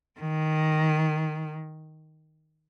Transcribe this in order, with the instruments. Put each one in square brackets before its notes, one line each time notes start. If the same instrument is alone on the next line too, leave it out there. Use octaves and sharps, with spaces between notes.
[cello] D#3